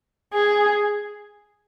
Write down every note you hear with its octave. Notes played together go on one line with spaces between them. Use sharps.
G#4